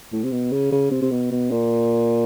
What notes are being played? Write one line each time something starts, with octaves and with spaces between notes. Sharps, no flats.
A2
C3
B2
C#3
C#3
C3
C3
B2
B2
A#2